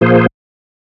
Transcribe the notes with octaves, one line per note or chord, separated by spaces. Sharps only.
A#2 F3 A#3 G#4 C5